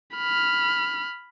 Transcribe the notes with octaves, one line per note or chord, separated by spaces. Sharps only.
B5 F6